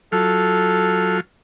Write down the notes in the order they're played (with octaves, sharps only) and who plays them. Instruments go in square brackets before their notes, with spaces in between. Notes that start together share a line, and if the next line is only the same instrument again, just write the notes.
[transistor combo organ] F#3 F4 [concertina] A4